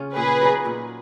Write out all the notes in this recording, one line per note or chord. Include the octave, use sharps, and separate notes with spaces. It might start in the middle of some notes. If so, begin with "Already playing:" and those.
Already playing: C#3 C#4 F4
A#2 G#4 B4
F#3 B3 D#4
A#2